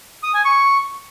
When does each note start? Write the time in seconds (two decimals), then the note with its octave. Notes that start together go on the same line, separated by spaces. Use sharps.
0.23 D#6
0.34 G#5
0.45 C#6